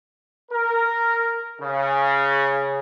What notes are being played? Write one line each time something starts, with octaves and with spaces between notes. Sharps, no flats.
A#4
C#3